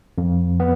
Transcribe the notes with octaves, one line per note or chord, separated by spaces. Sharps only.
F2
B3